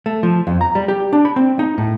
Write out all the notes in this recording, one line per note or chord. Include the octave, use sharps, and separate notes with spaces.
A3
F3
F2
A#5
G3
G4
D4
B5
C4
D#4
A2